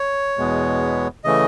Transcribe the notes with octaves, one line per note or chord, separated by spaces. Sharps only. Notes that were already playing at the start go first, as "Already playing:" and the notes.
Already playing: C#5
E2 B2 G#3 B3
C#3 E3 A3 D#5